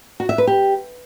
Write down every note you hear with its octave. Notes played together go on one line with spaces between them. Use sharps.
F#4
E5
B4
G4